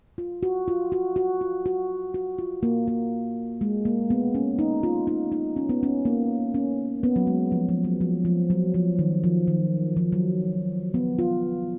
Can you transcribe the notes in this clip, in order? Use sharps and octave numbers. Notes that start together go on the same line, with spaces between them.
F4
F#4
F4
F#4
F#4
F4
F#4
F#4
F4
A#3
A#3
G#3
A#3
B3
C#4
D#4
F4
D#4
D#4
C#4
B3
C#4
A#3
C#4
B3
F#3
G#3
F3
F3
F#3
F3
F3
F#3
F3
D#3
F3
D#3
F3
F#3
B3
F4